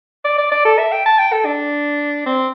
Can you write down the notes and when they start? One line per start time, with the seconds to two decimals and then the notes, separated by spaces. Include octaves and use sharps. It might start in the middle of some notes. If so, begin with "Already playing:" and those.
0.24 D5
0.38 D5
0.52 D5
0.65 A4
0.78 E5
0.92 G5
1.05 A5
1.19 G5
1.32 A4
1.45 D4
2.26 C4